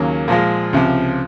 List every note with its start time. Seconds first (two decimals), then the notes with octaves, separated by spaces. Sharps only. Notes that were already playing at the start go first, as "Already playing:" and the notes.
Already playing: D#2 C#3 F#3 A#3
0.28 A#2 F3 G#3
0.73 C#2 C3 F3